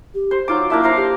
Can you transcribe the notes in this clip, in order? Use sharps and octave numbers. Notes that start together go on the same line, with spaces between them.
G4
C5
F#3 D#4 F4 D6
A#3 D4 E4 E5
C5 F5 A#5
G4